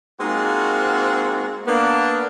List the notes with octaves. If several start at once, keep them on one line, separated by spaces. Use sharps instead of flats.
G#3 A#3 C4 D#4 F4 F#4
A#3 B3 D4